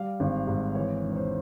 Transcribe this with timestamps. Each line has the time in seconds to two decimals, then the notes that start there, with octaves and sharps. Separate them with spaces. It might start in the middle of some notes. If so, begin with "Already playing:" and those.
Already playing: G3 F5
0.20 G#1
0.47 G#2
0.75 E3 C#5
1.02 E1
1.12 C#5
1.16 C5